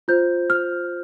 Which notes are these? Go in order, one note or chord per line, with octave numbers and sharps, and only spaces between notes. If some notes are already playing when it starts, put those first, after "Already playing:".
F4 C5 G6
F6